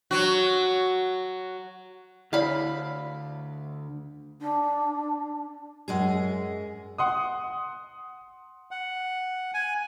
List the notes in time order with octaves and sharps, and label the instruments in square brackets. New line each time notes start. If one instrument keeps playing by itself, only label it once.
[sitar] F#3 F#4
[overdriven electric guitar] D2 [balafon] E4 C#5 D5 [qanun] F5 B5
[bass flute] D4
[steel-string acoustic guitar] F#2 G#3 G#4
[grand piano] F#5 C6 D#6
[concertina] F#5
G#5